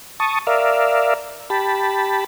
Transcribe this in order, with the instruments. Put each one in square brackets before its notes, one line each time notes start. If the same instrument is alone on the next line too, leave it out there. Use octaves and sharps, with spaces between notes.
[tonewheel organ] A5 C#6 D#6
A#4 D5 E5 F5
G4 A5 B5